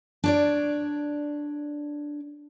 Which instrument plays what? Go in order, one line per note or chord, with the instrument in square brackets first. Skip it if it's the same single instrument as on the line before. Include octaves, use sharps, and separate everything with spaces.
[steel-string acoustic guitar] D4 C#5 D5